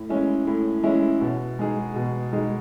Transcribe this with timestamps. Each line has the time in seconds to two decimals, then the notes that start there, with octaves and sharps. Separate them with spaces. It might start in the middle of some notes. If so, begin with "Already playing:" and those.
Already playing: A2
0.09 G#3 C#4 E4
0.47 A2
0.84 G#3 C#4 E4
1.21 B2
1.59 G#3 D#4 G#4
1.96 B2
2.33 G#3 D#4 G#4